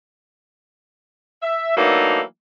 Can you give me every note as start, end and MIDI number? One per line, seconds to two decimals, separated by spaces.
1.43 1.76 76
1.77 2.22 52
1.77 2.22 54
1.77 2.22 57
1.77 2.22 58
1.77 2.22 62
1.77 2.22 63